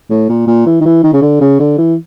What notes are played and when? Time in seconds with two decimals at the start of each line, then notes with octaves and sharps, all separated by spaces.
0.10 A2
0.29 A#2
0.47 A#2
0.67 E3
0.81 D#3
0.86 E3
1.04 D#3
1.14 C#3
1.22 D3
1.41 C#3
1.60 D3
1.78 E3